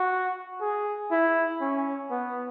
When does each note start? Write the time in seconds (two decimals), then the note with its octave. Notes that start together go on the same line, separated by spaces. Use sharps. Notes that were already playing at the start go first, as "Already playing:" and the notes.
Already playing: F#4
0.61 G#4
1.11 E4
1.61 C#4
2.11 B3